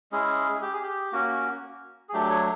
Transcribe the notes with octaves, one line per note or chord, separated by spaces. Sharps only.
G#3 C#4 E4 G#4
G4
G#4
G4
A#3 C#4 F#4
G#4
F#3 A3 D4 G4
C#5